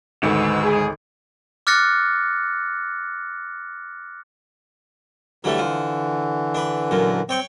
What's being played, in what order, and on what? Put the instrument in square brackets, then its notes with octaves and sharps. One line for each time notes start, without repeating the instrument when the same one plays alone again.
[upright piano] G#1 D2 [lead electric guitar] G#2 [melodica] F#4 B4 E6
[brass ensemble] G#4
[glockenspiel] D6 F6 F#6 A6 A#6 C#7
[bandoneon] D3 E3 [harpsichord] F#3 G3 A3
[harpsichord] F3
D4 B4
F#2 A#2
[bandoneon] C4 [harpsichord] C#5 G5 C#6